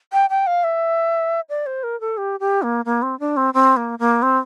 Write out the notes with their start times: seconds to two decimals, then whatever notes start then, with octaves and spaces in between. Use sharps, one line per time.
0.12 G5
0.30 G5
0.47 F5
0.64 E5
1.49 D5
1.66 C5
1.83 A#4
2.00 A4
2.17 G4
2.40 G4
2.62 A#3
2.85 A#3
3.02 C4
3.20 D4
3.37 C4
3.54 C4
3.77 A#3
3.99 A#3
4.22 C4